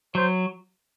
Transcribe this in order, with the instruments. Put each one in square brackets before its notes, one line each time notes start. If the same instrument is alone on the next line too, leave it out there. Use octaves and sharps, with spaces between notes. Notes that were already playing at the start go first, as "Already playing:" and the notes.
[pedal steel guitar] F#3 [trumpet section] C5